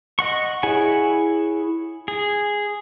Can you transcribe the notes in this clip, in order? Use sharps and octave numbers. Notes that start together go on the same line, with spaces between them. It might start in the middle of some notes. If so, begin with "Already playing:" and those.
D#5 F#5 C#6
E4 G#4 C#5 F#5 G#5
G#4